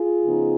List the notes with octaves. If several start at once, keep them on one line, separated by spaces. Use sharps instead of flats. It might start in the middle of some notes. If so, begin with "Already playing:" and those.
Already playing: F4 G#4
C#3 F3 B3 D#4